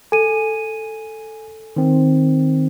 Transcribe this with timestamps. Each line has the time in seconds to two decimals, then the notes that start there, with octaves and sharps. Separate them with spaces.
0.12 A4 G#5 D#7
1.76 D#3 C4